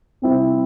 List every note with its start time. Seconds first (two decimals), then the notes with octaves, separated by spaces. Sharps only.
0.22 C3 G3 C4 E4